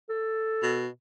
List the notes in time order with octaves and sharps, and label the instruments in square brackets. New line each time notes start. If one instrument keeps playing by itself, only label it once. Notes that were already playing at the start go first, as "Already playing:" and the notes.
[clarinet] A4
[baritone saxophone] B2